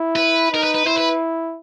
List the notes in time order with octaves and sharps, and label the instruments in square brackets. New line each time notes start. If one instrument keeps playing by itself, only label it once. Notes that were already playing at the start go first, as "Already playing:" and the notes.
Already playing: [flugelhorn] E4
[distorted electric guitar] B4
[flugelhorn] D#4 [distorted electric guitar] A#4
[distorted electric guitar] B4
B4
[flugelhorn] E4 [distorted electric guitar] C5
[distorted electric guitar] B4